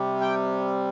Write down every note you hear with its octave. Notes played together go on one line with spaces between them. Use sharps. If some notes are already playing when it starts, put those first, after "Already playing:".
Already playing: C3 G3
G5